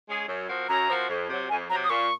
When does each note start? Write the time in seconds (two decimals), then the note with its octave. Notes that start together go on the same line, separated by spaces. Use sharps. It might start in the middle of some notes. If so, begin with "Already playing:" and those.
0.08 G#3 C#4 G#4
0.28 F#2
0.49 F3 C4 F#4 A#4
0.69 F#2 A#5
0.89 F3 C4 F#4 A#4
1.09 F2
1.29 C3 F#3
1.49 F2 G#5
1.70 F#3 A#5
1.75 C3
1.84 D#6
1.90 A#2 C#6